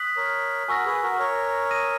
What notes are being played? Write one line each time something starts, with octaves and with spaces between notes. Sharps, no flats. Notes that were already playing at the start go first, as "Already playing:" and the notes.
Already playing: D#6 F#6 B6 F#7
A#4 C#5
F#4 A#4 G#5 C#6 E6 A#6
G#4 B4
F#4 A#4
A#4 C#5
D#6 A#6 D#7